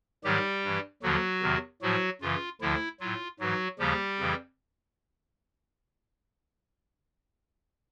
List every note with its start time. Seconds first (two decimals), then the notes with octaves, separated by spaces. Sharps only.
0.24 G#2 D#3 F#3 G3 G4
0.64 G2 E3
1.02 D#2 D3 F3 F#3 F#4
1.42 E2 C3 D#3
1.82 A2 F3 F#3 F#4
2.22 F#2 C#3 E3 F4
2.61 D2 D3 F3 E4
3.00 A2 F#3 F4
3.40 G#2 E3 F#3 F#4
3.79 D#2 C#3 F3 G3 G4
4.19 F2 C#3 E3